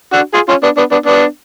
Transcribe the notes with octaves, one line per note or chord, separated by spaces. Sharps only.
D4 F#4
F4 G#4
C#4 F4
B3 D4
B3 D4
B3 D4
B3 D4